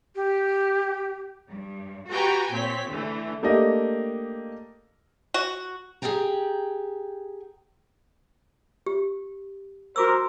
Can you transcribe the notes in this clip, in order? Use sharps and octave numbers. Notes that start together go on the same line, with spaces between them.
G4
G2
F#4 G4 B4 G5 G#5 A#5
A#2 C4 C#5 B6
D3 E3 A3
A3 A#3 D4 G4 D#5
F#4
G4 G#4 A#4 D#5 G5 A#5
G4
F#4 A#4 C5 D6 E6